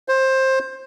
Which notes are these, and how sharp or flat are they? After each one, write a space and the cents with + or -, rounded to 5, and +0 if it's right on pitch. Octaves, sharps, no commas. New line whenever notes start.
C5 +15